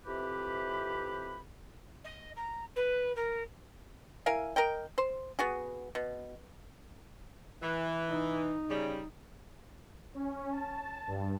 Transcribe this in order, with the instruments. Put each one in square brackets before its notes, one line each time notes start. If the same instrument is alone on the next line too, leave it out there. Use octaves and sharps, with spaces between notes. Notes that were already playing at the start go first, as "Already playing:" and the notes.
[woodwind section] F2 C3 E3 G4 B4 B5
[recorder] D#5
A#5
B4
A#4
[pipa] E4 A#4 F5 G#5
A#4 D#5 G5
C5
B3 F#4 G#4
B2
[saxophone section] E3
[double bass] D#4
[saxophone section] C#3 G3
[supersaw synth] C#4
A5
G2